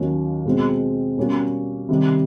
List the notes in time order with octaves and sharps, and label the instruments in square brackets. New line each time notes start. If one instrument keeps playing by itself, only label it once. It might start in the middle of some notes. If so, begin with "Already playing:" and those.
Already playing: [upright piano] D#2 D#3 F#3 A#3 C#4
B2 G#3 C4
B2 G3 A#3 C#4
C3 D#3 G3